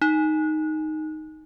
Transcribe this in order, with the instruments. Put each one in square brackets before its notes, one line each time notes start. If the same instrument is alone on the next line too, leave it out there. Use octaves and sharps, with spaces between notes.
[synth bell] D#4